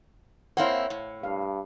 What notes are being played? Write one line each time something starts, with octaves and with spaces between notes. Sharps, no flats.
A#3 C4 E4 C5 C#5 F5 F#5
A2
G2 F5